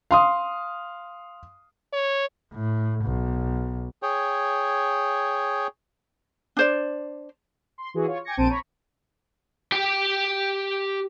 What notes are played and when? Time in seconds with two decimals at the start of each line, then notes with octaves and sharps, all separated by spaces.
0.11 F5 C6 D#6
1.93 C#5
2.52 A2
3.05 B1
4.03 G#4 C#5 G5
6.57 D4 C5 D5
7.78 C6
7.94 E3 F#4 G#4
8.06 F4 C#5
8.24 G5 G#5 D6 G#6 A#6 C#7
8.37 A#1 C4 C5 A5 D7 D#7
8.49 C#5 A#5 B5 C#6
9.72 G4 G5